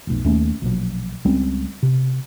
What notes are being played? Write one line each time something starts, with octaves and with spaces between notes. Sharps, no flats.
F1 B1
D#2 A3 C#4
A#1 B2 F#3
C#2 G3 C4 C#4
C3